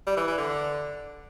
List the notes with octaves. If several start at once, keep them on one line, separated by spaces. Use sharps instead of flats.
G3
E3
E3
D3